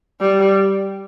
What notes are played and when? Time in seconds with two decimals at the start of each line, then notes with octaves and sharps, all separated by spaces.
0.21 G3